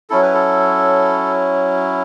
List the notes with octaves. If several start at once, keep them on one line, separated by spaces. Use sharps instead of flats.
F#3 C#4 E4 A4
B4
A4